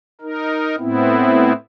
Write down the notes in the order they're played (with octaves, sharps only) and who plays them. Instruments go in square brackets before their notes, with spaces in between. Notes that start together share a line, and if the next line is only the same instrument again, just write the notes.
[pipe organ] D#4 A#4
A2 B3 C4 E4